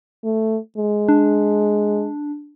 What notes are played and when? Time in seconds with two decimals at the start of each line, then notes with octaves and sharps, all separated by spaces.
0.24 A3
0.77 G#3
1.09 D4